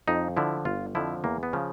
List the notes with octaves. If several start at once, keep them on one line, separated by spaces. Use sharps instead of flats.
F2 D#4
D3 F3 E4
G1 F4
F2 D3 F3 E4
E2 A#3
B3
C#3 F3